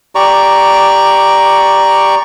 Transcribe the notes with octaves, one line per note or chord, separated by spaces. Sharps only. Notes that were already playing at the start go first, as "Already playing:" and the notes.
G4 D5 A#5 C#6